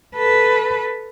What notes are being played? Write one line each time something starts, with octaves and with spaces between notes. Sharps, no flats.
A4 B4